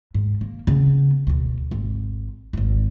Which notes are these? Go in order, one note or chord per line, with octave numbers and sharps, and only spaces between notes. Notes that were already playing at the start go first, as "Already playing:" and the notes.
G#2
A#3
C#3 B3
D2 B2
G#1
D1 G#1